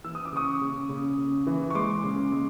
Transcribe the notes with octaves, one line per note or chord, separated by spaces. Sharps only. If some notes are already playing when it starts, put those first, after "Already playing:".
E3 E6
D#6
D6
C#3 C#6 D#6
C#3
C#3
C#3
E3
C#6
G#3 C6 D6
C#3
G#3